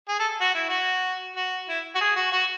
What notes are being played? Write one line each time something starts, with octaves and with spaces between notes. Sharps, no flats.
G#4
A4
F#4
E4
F#4
F#4
E4
F#4
G#4
F#4
F#4